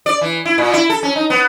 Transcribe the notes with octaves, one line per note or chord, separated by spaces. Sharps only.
D5
E3
E4
A#2
E4
A4
C#4
D#4
B3